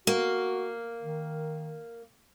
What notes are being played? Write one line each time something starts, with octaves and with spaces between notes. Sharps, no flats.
A#3 F#4
D#3